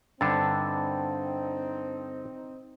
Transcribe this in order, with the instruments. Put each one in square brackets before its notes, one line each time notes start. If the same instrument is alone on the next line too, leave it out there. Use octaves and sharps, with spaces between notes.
[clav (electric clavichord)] G2 D3 [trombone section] C4 D#4 [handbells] D4 E6 A6